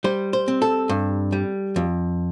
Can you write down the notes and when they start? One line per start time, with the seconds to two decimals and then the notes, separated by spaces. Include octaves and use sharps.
0.04 G3 C5
0.33 C5
0.48 C4
0.62 A4
0.89 G2
1.32 G3
1.76 F2